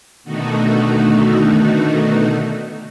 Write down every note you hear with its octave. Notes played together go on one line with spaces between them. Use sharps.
B2 D3 D#3 A3 D#4 F#4